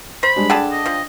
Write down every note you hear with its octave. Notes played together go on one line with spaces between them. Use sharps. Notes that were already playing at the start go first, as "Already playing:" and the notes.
C5 B5
G3 G#3 D4
D3 D4 G#4 G5 A5
D#5
F3